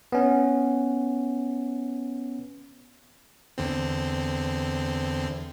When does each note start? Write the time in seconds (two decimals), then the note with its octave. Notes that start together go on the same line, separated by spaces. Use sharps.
0.12 B3 C#4
3.58 E2 D3 C4